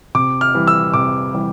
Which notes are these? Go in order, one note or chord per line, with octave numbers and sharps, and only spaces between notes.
C3 D6
F6
E3 G3
E6
C3 D6
E3 G3